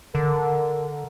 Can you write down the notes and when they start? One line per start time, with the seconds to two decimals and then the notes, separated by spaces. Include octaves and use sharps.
0.15 D3 A#4